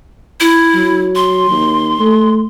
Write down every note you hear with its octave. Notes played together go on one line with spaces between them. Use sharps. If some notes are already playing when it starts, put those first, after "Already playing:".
E4
F#3
C6
D#2
A3